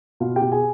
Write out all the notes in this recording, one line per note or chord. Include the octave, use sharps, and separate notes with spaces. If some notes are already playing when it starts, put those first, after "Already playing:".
B2 F4 F5
G4 G5
B2
G#4 G#5